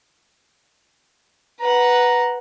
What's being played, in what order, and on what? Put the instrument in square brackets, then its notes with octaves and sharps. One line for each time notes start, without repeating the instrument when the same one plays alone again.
[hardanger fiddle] B4 F#5 [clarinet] A#5